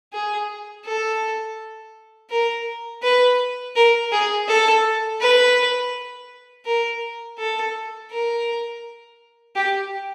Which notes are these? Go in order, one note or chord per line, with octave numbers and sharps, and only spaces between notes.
G#4
A4
A#4
B4
A#4
G#4
A4
B4
A#4
A4
A#4
G4